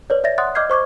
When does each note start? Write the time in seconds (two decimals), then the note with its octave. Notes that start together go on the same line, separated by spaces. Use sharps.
0.10 B4 C#5 D5
0.24 D5 E5 A6 A#6
0.38 F#5 C6 D#6 F#6 A6
0.55 D#5 D6 F6 G6 G#6 C7
0.70 C5 C#6 D6 G#6